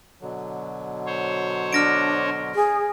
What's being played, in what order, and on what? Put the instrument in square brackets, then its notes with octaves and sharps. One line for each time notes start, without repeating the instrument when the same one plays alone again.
[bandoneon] B2 D3 F#3
[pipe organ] C5 C#5
[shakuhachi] D4 [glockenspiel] F6 A#6 D7
[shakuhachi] G#4